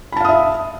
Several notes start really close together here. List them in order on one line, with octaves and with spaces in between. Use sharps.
B5 A5 F5 D#6 E5